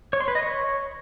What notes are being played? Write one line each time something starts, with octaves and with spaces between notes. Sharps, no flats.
C#5
C6
B4
D#5
C#5